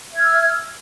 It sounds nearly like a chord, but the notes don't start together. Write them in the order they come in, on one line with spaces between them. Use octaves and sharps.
E5 G#6 F6 E6